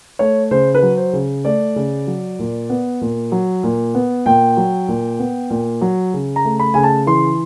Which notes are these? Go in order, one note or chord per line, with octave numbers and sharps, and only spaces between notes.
A3 C#5
C#3 C5
B4
F#3
C5
C#3
A3 D5
C#3
F#3
A#2
B3
A#2
F#3
A#2
B3
A#2 G5
F#3
A#2
B3
A#2
F#3
C#3
A#5
A3
B5
C#3 G#5
A5
E3 C6